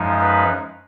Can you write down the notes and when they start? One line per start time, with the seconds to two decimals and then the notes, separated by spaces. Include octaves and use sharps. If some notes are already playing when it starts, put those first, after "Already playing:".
Already playing: F#2 F3 G#3 D#4
0.21 B4